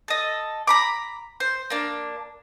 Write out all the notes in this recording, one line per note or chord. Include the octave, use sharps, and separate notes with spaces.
A4 D#5
A#5 B5 D6
C5
A#3 D4